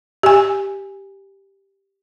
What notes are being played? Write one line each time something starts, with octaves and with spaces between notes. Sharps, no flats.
G4 G#5